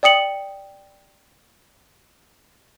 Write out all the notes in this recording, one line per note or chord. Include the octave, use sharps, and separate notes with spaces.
D5 G5 D#6 C#7 F#7